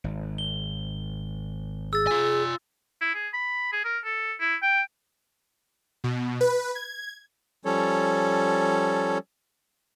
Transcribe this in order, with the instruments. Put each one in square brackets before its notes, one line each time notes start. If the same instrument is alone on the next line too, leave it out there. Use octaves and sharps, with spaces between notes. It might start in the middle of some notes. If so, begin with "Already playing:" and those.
[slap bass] G#1
[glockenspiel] G7
[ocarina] G#4 [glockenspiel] E6 A6
[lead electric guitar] F4 G#5
[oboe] E4
G#4
B5
G#4
A#4
A4
E4
G5
[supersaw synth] B2
B4
G#6
[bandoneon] F3 G3 C#4 A4 C#5